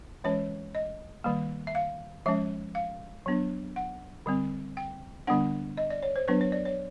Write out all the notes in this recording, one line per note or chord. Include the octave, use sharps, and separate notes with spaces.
E3 G#3 C#4 C#5
D#5
D#3 G3 A#3
E5
F5
F3 G#3 C#4 E5
F5
F#3 B3 D4
F#5
D3 G3 C4
G5
D3 G3 B3 D4 F#5
D#5
D5
C#5
C5
F#3 B3 D4 B4
C#5
D5
C#5